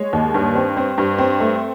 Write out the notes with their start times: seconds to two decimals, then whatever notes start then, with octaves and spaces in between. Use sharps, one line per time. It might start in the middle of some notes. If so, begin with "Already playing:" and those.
Already playing: G#3 C#5
0.13 D#2
0.34 G2
0.55 C4
0.77 C4
0.98 G2
1.18 C4
1.40 A3